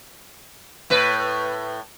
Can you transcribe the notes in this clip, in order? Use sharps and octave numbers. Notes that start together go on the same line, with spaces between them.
A2 B4